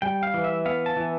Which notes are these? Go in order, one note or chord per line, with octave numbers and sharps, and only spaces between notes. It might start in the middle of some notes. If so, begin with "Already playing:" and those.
G3 G5
F5
E3
E5
B3 F5
A5
E3